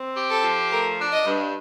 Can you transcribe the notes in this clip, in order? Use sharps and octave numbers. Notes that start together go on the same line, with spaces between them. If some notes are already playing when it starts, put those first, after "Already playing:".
Already playing: C4
G4
A4
F3
A3 A#4
D4
D#5
G2